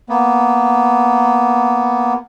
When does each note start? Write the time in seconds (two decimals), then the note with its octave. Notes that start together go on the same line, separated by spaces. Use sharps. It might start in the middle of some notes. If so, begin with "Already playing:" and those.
0.09 A#3 B3